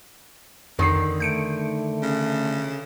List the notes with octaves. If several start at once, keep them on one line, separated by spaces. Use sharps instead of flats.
F2 D3 D#3 D#6 C7
A3 G6 C#7 D7
C#3